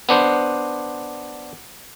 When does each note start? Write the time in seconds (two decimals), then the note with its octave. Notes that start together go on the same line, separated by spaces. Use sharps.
0.09 B3 D4 C5